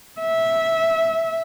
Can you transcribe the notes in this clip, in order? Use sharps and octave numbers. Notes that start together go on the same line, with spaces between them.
E5